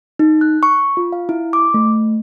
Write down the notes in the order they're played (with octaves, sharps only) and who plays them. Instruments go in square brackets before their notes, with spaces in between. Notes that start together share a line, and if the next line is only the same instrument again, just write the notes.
[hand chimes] D#4
F#6
C#6
F4
F5
E4
D6
A3